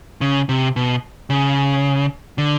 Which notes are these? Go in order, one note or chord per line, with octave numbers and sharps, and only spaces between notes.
C#3
C3
B2
C#3
D3